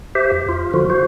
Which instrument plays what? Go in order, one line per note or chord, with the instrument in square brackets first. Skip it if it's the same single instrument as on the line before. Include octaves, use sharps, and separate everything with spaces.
[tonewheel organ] G4 C5 E5
F2
F4
D3 F3 F4 F#4
F#4 C5